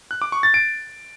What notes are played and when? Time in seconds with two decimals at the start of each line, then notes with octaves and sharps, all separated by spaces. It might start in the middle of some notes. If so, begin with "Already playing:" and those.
0.11 F#6
0.22 D6
0.32 C#6
0.43 A6
0.54 D7